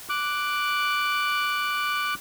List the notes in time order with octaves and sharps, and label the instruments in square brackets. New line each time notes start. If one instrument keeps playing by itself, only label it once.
[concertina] D6 F#6